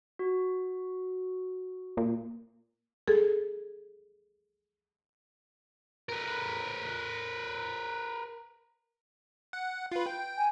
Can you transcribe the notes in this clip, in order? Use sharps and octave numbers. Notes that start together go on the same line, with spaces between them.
F#4
A#2
G#4 A4
A#4 B4
F#5
F4 B4
G5
G#5